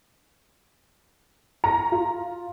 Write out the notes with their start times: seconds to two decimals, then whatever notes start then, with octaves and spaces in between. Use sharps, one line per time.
1.64 A#5
1.92 F4